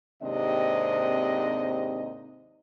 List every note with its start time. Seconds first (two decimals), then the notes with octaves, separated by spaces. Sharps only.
0.22 D#2 G#2 C3 C4 D4 D#5